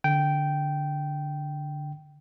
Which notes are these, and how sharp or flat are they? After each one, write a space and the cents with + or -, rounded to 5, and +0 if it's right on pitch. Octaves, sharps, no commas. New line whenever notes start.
D3 +0 G5 -10